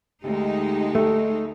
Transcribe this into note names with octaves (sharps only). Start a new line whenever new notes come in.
D2 G#3 D#4 G4
A3